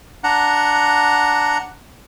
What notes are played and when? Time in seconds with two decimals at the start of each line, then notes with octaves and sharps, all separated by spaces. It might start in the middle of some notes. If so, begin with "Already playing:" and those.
0.24 D4 F#5 A#5